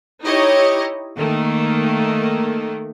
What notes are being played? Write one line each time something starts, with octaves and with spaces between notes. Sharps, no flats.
D#4 E4 G4 C#5 D#5
D#3 A3 A#3